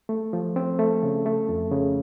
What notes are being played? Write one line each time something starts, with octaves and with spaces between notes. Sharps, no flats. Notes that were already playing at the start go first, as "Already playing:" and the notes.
A3
F3
C4
A3
C#3
A3
F2
C#3